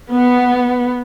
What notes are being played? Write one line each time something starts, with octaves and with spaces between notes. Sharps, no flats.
B3